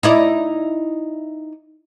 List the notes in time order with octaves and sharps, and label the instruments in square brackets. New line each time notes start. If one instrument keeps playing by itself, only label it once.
[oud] D#4 E4 D5